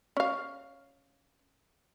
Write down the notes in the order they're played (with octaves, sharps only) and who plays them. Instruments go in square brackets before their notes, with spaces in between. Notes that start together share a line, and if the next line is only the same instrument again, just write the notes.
[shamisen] C#4 F5